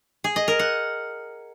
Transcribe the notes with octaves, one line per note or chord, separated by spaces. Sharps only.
G#4
D#5
A#4
F#5